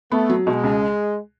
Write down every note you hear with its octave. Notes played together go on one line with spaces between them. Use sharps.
A3 B3
F#3
B2 G#3
C#2